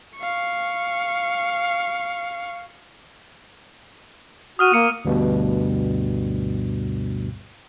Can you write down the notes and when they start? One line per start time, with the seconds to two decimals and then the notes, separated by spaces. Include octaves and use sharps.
0.17 F5 C#6
4.59 F#4 D#6 F6 D#7
4.74 A#3 C#7
5.05 D2 G2 B2